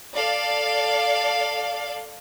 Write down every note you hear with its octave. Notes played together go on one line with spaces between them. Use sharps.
A4 D5 F5